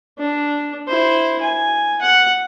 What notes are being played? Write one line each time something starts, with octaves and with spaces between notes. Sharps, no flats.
D4
E4 C5
G#5
F#5